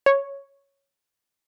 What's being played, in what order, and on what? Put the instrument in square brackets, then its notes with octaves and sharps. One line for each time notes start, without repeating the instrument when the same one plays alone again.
[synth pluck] C#5